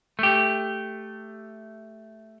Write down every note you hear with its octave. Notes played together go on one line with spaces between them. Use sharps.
A3 G4